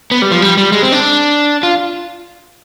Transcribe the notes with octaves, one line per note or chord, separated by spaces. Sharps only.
B3
G3
F3
G3
G3
G#3
C4
D4
F4